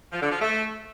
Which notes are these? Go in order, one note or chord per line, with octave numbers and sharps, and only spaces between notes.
F3
D3
F3
A3